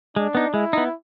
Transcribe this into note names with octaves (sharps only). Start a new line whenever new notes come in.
G#3 D4
B3 D#4
G#3 E4
B3 D#4